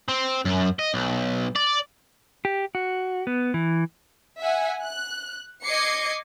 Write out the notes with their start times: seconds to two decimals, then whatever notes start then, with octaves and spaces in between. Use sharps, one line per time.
0.09 C4
0.45 F#2
0.79 D#5
0.94 B1
1.56 D5
2.45 G4
2.75 F#4
3.27 B3
3.54 E3
4.40 E5 F#5 G#5
4.83 F#6
5.65 D#5 D6 G#6 C7 C#7